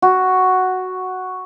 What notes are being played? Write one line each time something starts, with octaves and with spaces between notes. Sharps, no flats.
F#4